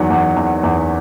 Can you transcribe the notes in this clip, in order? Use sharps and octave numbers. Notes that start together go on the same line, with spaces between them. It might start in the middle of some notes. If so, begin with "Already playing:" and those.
Already playing: E2 D#3 F#3 F#5
E2
E2
E2